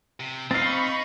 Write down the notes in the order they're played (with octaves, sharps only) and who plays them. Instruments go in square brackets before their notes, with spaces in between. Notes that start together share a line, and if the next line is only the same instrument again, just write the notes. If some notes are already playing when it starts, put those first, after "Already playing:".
[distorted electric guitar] C3
[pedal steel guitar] C4 F5 [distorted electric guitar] D#4 [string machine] B5 C#6 [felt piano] A6 C7